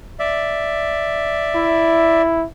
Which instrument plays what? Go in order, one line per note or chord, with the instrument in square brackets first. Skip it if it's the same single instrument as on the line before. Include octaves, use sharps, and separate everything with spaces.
[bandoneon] D5 E5
[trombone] E4